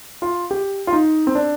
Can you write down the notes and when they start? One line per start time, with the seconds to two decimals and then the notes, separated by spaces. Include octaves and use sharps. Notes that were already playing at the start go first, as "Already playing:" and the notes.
0.22 F4
0.51 G4
0.87 F4
0.93 D#4
1.27 C4
1.35 D4